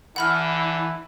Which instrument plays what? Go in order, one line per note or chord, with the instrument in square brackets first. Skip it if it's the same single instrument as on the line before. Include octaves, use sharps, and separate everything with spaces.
[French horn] D3 [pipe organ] E3 [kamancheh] E4 [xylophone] F#5 B5 F6